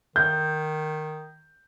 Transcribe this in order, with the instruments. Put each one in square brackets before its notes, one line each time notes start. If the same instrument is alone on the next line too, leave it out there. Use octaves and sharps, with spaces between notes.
[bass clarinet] D#3 [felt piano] G6